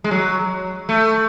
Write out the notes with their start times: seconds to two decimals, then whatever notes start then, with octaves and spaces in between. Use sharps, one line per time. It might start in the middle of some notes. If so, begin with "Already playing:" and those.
0.04 G#3
0.11 F#3
0.89 A3